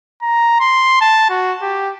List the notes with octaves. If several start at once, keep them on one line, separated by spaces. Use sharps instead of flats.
A#5
C6
A5
F#4
G4